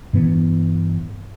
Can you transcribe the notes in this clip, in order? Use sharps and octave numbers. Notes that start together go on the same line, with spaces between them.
G2 E3 B3